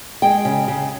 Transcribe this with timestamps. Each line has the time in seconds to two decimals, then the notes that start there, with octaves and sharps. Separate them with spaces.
0.22 G#3 G5
0.45 C#3
0.68 C#3